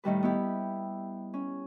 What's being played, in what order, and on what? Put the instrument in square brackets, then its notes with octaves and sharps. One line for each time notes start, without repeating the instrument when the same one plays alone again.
[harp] A2 D#3 G3 B4
B3 E4 G4
C#4